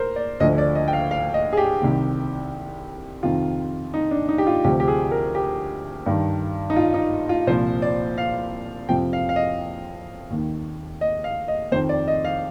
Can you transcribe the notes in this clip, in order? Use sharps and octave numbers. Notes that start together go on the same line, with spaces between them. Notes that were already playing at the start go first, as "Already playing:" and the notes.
Already playing: A#4 C5
D5
D2 D3 F3 D#5
D5
D#5
G5
F5
F5
D#5
G#4
G4
C2 C3 D#3
F2 C3 D#3 F4
D#4
D4
D#4
G4
F4
D2 C3 F3 G4
G4
G#4
A#4
G4
G2 D#3
D#4
F4
D#4
F4
C2 A#2 F3 C5
D5
F5
F2 C3 F3 G5
F5
F5
D#5
D#2 D#3
D#5
F5
D#5
F2 D#3 C5
D5
D#5
F5